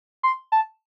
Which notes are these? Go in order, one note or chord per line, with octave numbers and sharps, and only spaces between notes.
C6
A5